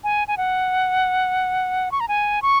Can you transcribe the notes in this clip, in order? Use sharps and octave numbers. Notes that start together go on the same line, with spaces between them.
G#5
G#5
F#5
C#6
A#5
G#5
C#6